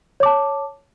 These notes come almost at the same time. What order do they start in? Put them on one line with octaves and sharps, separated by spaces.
C#5 D6 A5